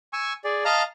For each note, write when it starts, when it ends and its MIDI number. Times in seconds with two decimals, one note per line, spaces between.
0.13 0.33 80
0.13 0.33 85
0.13 0.33 88
0.44 0.64 68
0.44 0.64 74
0.65 0.82 75
0.65 0.82 77
0.65 0.82 81
0.65 0.82 82
0.65 0.82 89